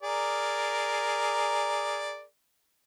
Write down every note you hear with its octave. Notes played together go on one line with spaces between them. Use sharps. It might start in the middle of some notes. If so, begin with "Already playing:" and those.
G#4 A#4 D5